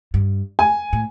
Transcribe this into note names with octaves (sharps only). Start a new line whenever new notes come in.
G2
G#5
A2